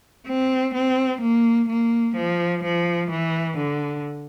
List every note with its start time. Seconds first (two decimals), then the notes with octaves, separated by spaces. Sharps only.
0.27 C4
0.74 C4
1.22 A#3
1.69 A#3
2.17 F3
2.64 F3
3.11 E3
3.58 D3